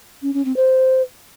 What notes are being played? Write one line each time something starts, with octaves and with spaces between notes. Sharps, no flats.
C#4
C#4
C4
C5